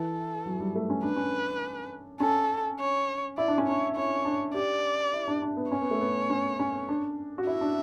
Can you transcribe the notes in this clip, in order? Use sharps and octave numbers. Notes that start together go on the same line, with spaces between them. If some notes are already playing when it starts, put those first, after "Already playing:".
Already playing: E3 A4
F#3
G3
A3
C#4
D4 B4
C#4
C#4 A4
C#5
E4 D5
D4
C#4
D4 C#5
E4 C#5
D4
G4 D5
E4
D4
D4
B3
C#4 C#5
B3
A3
B3
C#4
C#4
D4
F#4
E4 E5
D4